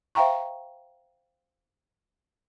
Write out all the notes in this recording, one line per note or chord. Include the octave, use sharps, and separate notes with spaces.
C5 E5 F5 G5 A#5 C#6